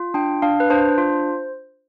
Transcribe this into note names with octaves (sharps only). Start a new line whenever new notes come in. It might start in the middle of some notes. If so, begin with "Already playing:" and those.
Already playing: F4
D4 G5
D4 F5
B4
D4 C5
F4